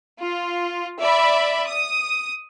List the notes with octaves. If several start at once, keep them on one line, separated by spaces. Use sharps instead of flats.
F4
D5 E5 B5
D#6